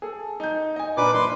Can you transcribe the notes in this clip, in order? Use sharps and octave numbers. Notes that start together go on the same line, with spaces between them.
G#4 A4
D#4 G6
D#5 G#5
A#2 A#3 D4 B4 D6
A#1 B4 C6